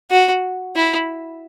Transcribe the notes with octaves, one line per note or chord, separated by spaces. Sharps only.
F#4
E4